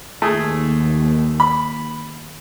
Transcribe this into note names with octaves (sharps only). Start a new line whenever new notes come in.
D#2 A3 G#4
B5